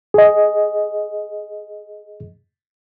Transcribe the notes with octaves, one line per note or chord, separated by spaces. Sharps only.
G#4 D#5